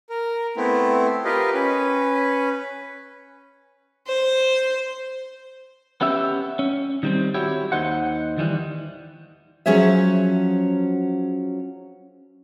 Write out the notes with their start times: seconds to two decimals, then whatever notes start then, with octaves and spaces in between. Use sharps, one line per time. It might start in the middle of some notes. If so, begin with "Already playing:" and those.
0.10 A#4
0.57 A3 B3 C4 E4
1.25 F4 G4 A#4 B4 D#5
1.54 C#4 B4
4.08 C5
6.01 B3 C#4 G4 E5
6.59 C#4
7.03 D#3 G3 C4
7.34 E4 F#4 G4 C#5
7.72 D#2 D#4 C5 F#5
8.38 D#3 E3 G3
9.66 F3 F#3 C#4 G#4 C#5 E5